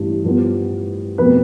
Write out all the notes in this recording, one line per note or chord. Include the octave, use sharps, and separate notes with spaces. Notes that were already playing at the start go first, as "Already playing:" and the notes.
Already playing: A1 G2
G2 F3 B3
F1 B2 A3 C4 B4